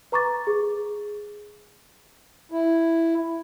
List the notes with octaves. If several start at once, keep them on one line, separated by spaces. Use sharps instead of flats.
B4 A#5 C#6 D6 A6
G#4
E4